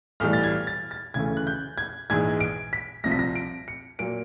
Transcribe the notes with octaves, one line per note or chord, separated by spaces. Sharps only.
B1 A2 E3 G3 F6
A6
G#6
A6
A6
D2 C#3 E3 A3 G#6
F#6
G6
G#6
A#1 G#2 E3 G#3 G#6
D7
B6
C2 C3 F3 A#6
B6
A#6
D7
C#7
A#2 F#3 A#3 D7